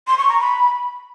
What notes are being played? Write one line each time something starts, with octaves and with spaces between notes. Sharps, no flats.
C6
C#6
A#5
B5